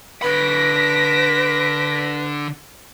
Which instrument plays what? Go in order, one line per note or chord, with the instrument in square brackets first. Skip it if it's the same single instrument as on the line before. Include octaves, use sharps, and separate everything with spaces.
[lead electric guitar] D3 B5 [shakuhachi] B4 [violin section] A#6 B6 D7